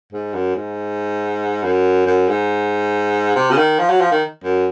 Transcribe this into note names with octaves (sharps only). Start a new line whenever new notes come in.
G#2
F#2
G#2
F#2
F#2
G#2
C3
C#3
D#3
F3
F#3
F3
D#3
F#2